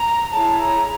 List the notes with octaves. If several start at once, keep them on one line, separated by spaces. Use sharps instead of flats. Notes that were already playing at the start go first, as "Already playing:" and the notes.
Already playing: A#5
E4 G#4 C#5 A5
A#5